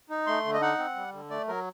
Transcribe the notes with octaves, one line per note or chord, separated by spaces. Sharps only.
D#4
A3 C6
D3
D#5
D#4 F#5
C4
G3
D3
A3 D5
F#3 A#4